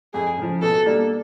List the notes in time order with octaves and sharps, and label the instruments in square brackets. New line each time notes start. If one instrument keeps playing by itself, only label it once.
[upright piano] F2 [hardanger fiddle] G#4
[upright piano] C#3 F3
[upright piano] B2 [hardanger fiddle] A4
[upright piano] G3 A#3 D4